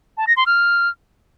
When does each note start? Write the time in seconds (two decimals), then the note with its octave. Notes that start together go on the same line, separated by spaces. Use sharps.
0.17 A5
0.27 A#6
0.37 C6
0.46 F6